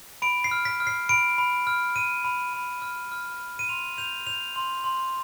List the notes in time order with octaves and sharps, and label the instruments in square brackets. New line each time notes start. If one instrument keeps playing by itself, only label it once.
[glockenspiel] B5 D7
C7
F6
B6
F6
C7
B5 D7
B5
F6
F6 D#7
B5
B5
F6
F6
B5
D#7
C6 F7
G6 F7
G6 F7
C6
C6